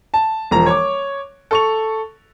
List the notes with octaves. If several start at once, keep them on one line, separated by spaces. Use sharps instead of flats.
A5
E1 F3 A#5
C#5 C#6 D6
A4 C#6 F7